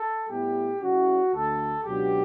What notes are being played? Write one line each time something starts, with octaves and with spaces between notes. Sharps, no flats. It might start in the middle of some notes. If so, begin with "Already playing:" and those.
Already playing: A4
A2 G3 B3 E4 G4
C#3 G3 C#4 E4 F#4
D2 D3 A3 A4
C#2 B2 F#3 B3 D4 G4